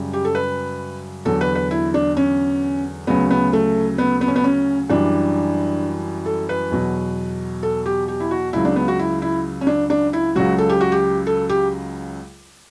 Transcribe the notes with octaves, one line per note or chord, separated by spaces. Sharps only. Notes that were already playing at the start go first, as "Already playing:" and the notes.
Already playing: F#2 C#3 G3
G4
A4
B4
E2 D3 F#3 A4
B4
B4
E4
D4
C#4
D2 C#3 F#3 B3
B3
A3
B3
B3
C#4
B3
C#4
F#2 E3 G3 D4
A4
B4
E2 B2 F#3
A4
G4
G4
E4
F#4
C#2 C#3 F#3 E4
D4
B3
F#4
E4
E4
C#4
D4
D4
E4
C#2 C#3 F#3 F#4
A4
G4
F#4
G4
A4
G4